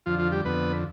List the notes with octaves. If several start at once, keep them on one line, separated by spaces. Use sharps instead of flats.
F2 D3 F3 F4
F3 F4
G3 G4
F2 D3 B3 B4